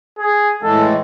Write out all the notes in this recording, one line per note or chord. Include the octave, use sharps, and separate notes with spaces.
G#4
A2 E3 G#3 A4